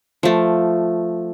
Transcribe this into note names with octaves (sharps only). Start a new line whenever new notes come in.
F3 A3